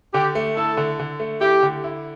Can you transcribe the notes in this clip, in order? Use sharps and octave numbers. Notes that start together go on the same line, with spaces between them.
D3 G4
A3
E4 A4
D3
D3
A3
E4 G4
D3
E4